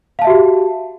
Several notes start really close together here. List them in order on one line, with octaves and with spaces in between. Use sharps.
F5 A5 E5 F#4 G4